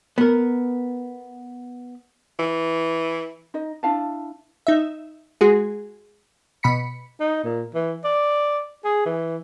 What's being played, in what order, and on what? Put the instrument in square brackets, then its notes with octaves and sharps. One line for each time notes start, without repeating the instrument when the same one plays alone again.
[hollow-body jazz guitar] B3 A#4
[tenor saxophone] E3
[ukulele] D#4 D#5
D4 E4 F5 A5
[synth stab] D#4 E5
G#3 F#4 G#4
B2 B5 B6 C#7
[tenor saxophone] D#4
A#2
E3
D5
G#4
E3